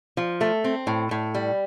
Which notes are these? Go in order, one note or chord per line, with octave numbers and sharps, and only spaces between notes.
F3
A3
C4
A2
A2
G3